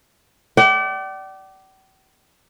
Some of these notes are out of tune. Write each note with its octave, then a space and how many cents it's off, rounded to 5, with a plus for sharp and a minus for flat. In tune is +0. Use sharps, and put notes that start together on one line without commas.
D5 +0 G5 -45